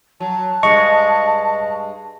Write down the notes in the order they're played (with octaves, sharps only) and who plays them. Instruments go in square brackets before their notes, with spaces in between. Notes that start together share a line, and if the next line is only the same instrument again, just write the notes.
[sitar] F#3 [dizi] A5
[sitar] G2 G#3 [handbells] D#5 [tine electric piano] C#6